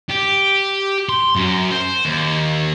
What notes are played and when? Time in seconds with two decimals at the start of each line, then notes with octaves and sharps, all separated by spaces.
0.09 G4
1.09 C6
1.36 F#2
1.71 C5
2.05 D#2